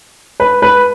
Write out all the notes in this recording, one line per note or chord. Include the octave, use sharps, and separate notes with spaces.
B4
B4